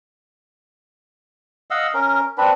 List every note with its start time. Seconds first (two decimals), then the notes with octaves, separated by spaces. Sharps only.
1.71 D#5 F5 F#5 E6
1.94 C#4 A#4
2.38 C4 D4 B4